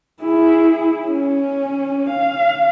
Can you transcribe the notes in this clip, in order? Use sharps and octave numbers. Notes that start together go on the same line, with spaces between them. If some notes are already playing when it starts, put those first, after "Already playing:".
E4 G#4
C#4
F5